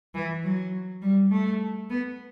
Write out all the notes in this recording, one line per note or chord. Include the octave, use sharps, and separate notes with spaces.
E3
F#3
G3
A3
B3